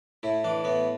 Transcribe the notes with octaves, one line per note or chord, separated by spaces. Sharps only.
A2 E4
E3 D4
A2 B3